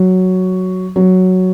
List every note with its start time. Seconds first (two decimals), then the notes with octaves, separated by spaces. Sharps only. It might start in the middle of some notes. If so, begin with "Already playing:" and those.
Already playing: F#3
0.96 F#3